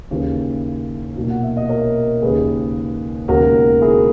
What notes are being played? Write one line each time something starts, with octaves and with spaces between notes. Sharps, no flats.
D#2 C#3 E3
B1 A#2 A#3
F#5
E5
D#5
A#4 C#5
D#2 C#3 G#3 G#4 B4
E1 D#2 C#3 F#4 A#4
E4 G#4